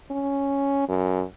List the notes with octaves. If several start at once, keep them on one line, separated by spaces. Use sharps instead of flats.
C#4
F#2